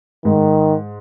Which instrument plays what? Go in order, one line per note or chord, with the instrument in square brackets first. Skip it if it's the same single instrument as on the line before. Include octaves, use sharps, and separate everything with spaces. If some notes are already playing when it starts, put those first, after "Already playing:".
[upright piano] G#2 [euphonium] D#3